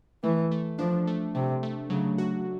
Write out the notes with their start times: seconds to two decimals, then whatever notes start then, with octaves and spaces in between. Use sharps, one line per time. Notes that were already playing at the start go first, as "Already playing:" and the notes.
0.24 E3 A3
0.52 A3
0.79 F3 D4
1.07 A3
1.35 C3 A3
1.63 A3
1.90 C#3 F#3
2.18 F#4